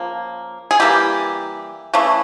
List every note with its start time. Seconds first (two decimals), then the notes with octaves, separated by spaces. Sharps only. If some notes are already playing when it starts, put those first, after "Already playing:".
Already playing: C#3 F3 A#3
0.71 G#4
0.80 E3 G3 A#3 G4
1.94 C#3 E3 A3